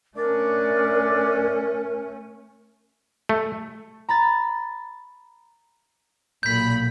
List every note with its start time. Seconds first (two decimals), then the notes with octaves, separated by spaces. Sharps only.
0.17 A3 C#4 D4 A#4 D5
3.29 A3
4.09 A#5 B5 A6
6.43 B1 A#2 B5 G6 B6